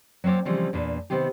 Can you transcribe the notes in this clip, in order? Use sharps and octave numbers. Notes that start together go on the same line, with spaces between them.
F#3 A#3 C4 C#5 D5
C#3 E3 F3 G3 G#3 C4
E2 A#2 D4 B4 A5
C3 D#3 B3 C4 G4